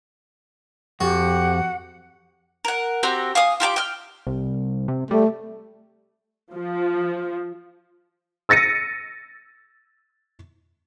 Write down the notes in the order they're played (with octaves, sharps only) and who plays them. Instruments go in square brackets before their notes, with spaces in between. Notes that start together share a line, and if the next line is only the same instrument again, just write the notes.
[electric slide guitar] F2 [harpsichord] F#4 [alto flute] G4 [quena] F#5
[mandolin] A#4 F#5
C4 F#4 G4 A#5
F5 G#5 D#6
F4 G4 A5 D6
G5 F6
[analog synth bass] C2
C3
[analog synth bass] G3 [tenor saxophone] A3
[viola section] F3
[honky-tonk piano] E6 A6 A#6 C#7 D#7